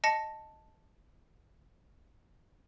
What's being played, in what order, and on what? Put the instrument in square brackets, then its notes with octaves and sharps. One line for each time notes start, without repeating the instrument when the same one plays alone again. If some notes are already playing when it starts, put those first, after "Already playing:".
[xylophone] D#5 A5 A#6 C#7